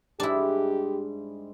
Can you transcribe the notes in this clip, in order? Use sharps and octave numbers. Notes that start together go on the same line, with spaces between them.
G#2 G3 G#3 D4 E4 G4